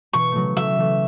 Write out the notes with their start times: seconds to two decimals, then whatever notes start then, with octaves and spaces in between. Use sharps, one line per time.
0.13 B2 E3 C#6
0.31 C#3 F#3 A3
0.57 E3 A3 E5
0.79 E3 A3